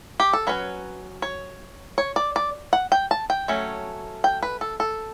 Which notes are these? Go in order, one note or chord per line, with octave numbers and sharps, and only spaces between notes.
G4
A4
F#3 C#4 B4
C#5
C#5
D5
D5
F#5
G5
A5
G5
F#3 A3 C#4
G5
B4
A4
A4